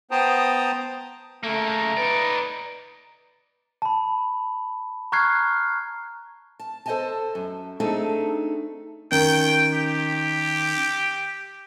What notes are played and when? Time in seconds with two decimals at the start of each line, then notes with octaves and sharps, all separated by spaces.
0.11 B3 C5 G5 A5 A#5 D#6
1.44 C#3 A3 A#3 A#5
1.97 D#4 B4 D5
3.82 A5 B5
5.12 A#5 C#6 F6 F#6 G#6 C7
6.60 A5
6.86 A4 C5 C#5 D#5 G#5 A5
7.35 F#2
7.80 A3 C4 D4 D#4 G#4 A4
9.12 D#3 C#4 G5
9.74 G4